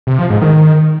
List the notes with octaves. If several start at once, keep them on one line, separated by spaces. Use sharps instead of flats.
C3
F3
G#2
D#3